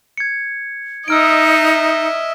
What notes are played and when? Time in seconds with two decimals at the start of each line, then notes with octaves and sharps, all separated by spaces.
0.17 G#6 C#7
1.08 D#4 D#5 E5 E6 F6 D7